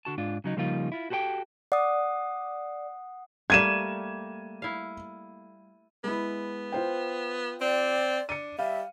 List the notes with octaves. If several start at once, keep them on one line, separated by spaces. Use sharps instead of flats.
D3 F#4 A5
G#2 D4 F4
C#3 F#3 D#4
C#3 F3 G3 A#3 D#4 F4
E4 F4
F#4 G4 A4 B4 G5
D5 F#5 D#6
G3 A3 A#3 G#6 D#7 E7
E4 F5
G#3 B3 E4
F4 C5 G5
C4 D5
D4 C#7 D#7
G3 E5 F5